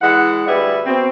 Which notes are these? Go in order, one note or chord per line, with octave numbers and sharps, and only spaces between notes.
E3 G#3 F#5
D2 G3 G#4 B4 E5
B2 C4